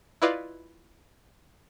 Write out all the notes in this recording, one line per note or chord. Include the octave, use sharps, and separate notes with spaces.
E4 F4 B4 D5 D#5 F5